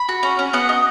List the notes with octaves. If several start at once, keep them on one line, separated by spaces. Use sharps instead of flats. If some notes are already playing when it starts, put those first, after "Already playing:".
Already playing: B5
F#4
C#4
C#4
B3 F#5
D#4